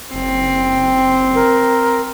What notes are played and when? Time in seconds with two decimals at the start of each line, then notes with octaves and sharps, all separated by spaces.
0.14 F#1 C4
1.35 A#4